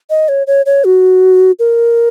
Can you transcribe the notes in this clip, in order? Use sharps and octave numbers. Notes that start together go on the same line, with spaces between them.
D#5
C#5
C#5
C#5
F#4
A#4